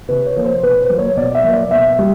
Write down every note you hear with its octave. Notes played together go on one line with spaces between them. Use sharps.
C3 B4
C#5
F3 A#3
C5
B2 B4
C5
F#3 A#3
C#5
B2 D5
E5
F#3 A#3
D5
B2 E5
G3